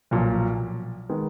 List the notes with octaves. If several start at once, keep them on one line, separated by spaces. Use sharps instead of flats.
B1 A#2 F3
D#3 G#3 B3